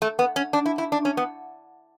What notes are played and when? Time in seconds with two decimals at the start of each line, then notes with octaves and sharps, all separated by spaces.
0.02 A3
0.19 B3
0.36 C#4
0.53 D4
0.66 E4
0.78 E4
0.92 D4
1.05 C#4
1.17 B3